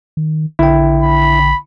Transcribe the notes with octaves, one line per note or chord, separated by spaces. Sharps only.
D#3
A#1 D3 E4 G5
B5